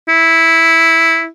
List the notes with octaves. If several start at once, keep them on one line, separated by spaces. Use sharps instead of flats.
E4